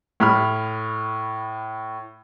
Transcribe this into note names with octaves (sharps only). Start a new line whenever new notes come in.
A2 B5 F6